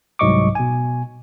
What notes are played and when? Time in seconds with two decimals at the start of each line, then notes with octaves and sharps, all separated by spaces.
0.19 C2 G#2 F#3 D#5 C#6 D6
0.55 B2 G#5